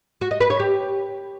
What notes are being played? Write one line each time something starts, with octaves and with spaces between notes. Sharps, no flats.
F#4
D#5
B4
C#5
G4